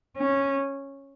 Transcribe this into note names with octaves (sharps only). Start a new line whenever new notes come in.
C#4